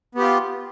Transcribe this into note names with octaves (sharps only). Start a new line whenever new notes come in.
B3 F4 G4